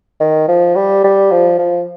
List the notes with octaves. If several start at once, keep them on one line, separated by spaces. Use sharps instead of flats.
D#3
F3
G3
G3
F3
F3